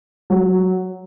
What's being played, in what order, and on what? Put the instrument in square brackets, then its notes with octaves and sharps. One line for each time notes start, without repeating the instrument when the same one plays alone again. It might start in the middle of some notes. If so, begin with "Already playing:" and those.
[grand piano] F#3